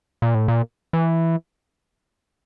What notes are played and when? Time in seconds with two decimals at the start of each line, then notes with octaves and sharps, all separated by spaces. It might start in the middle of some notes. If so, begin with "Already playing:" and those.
0.22 A#2
0.35 A2
0.48 A#2
0.93 E3